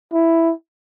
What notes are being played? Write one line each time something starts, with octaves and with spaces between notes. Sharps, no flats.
E4